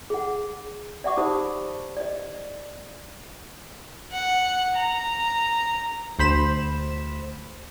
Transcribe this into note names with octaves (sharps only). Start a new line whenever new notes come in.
G#4 F#5
D5 E5 F#5 C#6 D6
D#4 G4 C5 A5 B5 D#6
D5 D#5
F#5
A#5
D2 C5 B5 E7